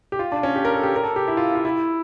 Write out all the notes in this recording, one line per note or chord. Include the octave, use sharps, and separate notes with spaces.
G4
F4
D4
C#4
G4
A#4
A4
G4
A#4
A4
G4
E4
F4
F4
E4